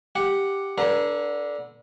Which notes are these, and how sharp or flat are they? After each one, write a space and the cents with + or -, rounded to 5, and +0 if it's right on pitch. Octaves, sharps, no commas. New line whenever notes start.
G4 +0 F#5 +0
D3 -5 B4 -40 A#5 -20